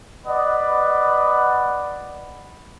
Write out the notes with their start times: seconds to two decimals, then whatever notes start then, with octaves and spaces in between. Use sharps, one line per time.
0.26 B4 D5 D#5 F#5